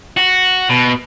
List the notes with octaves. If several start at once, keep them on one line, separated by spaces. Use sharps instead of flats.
F#4
B2